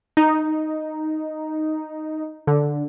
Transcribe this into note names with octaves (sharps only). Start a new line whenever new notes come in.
D#4
D3